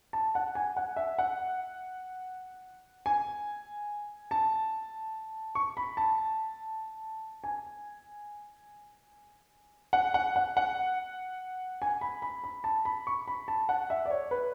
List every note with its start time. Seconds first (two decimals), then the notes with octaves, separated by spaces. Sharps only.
0.13 A5
0.35 F#5
0.55 G#5
0.77 F#5
0.96 E5
1.19 F#5
3.06 G#5
4.31 A5
5.55 C#6
5.77 B5
5.97 A5
7.44 G#5
9.93 F#5
10.14 F#5
10.36 F#5
10.57 F#5
11.82 G#5
12.01 B5
12.22 B5
12.44 B5
12.64 A5
12.85 B5
13.07 C#6
13.28 B5
13.48 A5
13.69 F#5
13.90 E5
14.06 D5
14.11 C#5
14.31 B4